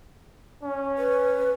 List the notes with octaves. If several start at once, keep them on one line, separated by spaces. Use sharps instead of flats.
C#4
B4